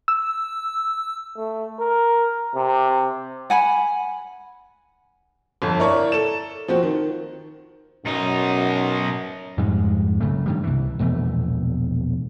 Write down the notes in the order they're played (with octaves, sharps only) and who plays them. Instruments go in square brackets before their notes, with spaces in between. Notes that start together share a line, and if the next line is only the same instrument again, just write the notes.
[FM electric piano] E6
[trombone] A3
A#4
C3
[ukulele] F#5 G#5 B5
[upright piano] G1 F2
E4 A#4 C#5 D5 C#6
A4 E7
F3 C4 F#4
D#3
[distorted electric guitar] B1 D#4 [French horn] F#2
[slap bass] F2 G#2 G3 G#3
F#1 C#3 A3
G2 D#3 G3
C2 E3
E1 A#1 E2 A3